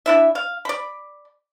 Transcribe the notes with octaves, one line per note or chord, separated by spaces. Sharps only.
D4 E4 E5
F5
D5 B5